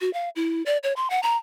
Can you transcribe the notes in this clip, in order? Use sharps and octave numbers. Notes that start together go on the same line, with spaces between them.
F#4
F5
E4
D5
C#5
C6
F#5
A#5